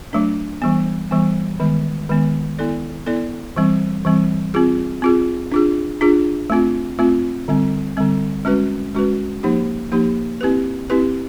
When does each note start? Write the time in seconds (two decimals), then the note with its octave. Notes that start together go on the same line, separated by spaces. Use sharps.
0.13 F#3 A3 D4
0.62 E3 G3 B3
1.11 E3 G3 B3
1.60 D#3 G#3 B3
2.09 D#3 G#3 B3
2.59 B3 E4 A4 D5
3.06 B3 E4 A4 D5
3.56 E3 G3 C4
4.05 E3 G3 C4
4.54 C4 F4 G#4
5.02 C4 F4 G#4
5.52 D4 F4 G#4
6.01 D4 F4 G#4
6.50 A3 C4 F4
6.99 A3 C4 F4
7.48 D3 G3 C4
7.97 D3 G3 C4
8.45 G#3 C#4 F#4 B4
8.95 G#3 C#4 F#4 B4
9.43 F3 A#3 D#4 G4
9.92 F3 A#3 D#4 G4
10.41 C4 E4 G4 B4
10.90 C4 E4 G4 B4